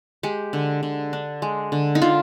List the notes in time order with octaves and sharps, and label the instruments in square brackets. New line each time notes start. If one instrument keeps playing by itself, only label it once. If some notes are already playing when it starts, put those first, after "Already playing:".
[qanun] G#3 G4
D3
D3
D4
G#3
D3
D#4
D3 F4